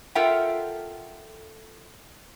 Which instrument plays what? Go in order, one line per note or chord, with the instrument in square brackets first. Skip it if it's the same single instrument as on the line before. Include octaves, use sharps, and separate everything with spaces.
[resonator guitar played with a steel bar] F4 A4 A#4 E5 F#5 G5